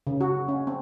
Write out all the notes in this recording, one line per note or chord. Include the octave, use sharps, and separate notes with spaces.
C#3
F#4
C#4
C4